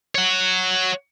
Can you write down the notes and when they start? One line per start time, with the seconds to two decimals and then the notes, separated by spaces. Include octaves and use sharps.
0.15 C#5 F#5